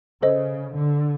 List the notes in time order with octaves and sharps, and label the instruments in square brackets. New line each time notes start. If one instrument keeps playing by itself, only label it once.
[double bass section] C#3 [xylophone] A4 C5 D#5
[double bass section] D3